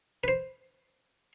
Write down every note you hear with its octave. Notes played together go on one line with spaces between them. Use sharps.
B4 C5